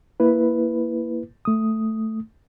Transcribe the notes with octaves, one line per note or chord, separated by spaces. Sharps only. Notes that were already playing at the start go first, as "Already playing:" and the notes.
A#3 E4 B4
A3 D#6